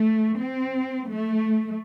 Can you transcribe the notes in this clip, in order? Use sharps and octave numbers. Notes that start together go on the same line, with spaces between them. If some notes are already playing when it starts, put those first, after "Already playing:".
Already playing: A3
C4
A3